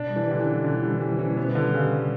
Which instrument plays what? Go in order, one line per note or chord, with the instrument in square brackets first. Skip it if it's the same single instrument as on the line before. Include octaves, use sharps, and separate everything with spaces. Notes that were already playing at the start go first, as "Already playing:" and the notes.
Already playing: [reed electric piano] B2 [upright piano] D4
[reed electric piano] G3
[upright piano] E3
[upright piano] D3 [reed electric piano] G4
[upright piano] E3
[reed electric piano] C#4
[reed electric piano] B2 [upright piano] D3
[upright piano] E3 [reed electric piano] G3
[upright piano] E3 [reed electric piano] G4
[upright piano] E3 [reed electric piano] C#4
[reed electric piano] B2 [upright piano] B3
[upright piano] D3 [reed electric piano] G3
[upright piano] C#3 [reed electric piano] G4
[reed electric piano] C#4